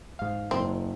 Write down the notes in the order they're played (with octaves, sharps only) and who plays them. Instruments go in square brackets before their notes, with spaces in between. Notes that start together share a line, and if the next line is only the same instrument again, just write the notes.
[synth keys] G#2 F5
[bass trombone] F#1 [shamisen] C4